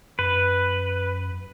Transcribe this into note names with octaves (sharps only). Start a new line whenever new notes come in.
F#2 B4